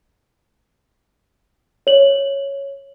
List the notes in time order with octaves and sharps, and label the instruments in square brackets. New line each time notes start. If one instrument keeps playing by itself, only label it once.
[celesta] C#5 F#7